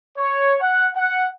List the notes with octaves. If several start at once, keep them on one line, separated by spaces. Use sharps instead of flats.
C#5
F#5
F#5